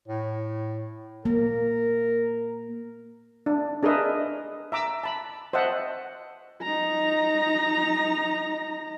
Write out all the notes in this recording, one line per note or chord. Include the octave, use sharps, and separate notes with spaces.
A2
A#3 A#4
D4
D4 G#4 A#4 B4 D#5 E5
E5 A#5 D6 E6
A5 B5
C5 D#5 E5 F#5 A5
D#4 A#5